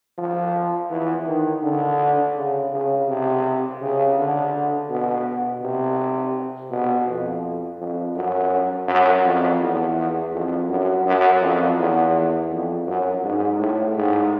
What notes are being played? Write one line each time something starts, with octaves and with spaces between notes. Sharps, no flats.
F3
E3
D#3
D3
C#3
C#3
C3
C#3
D3
B2
C3
B2
F2
F2
F#2
F#2
F2
E2
F2
F#2
F#2
F2
E2
F2
F#2
G#2
A2
G#2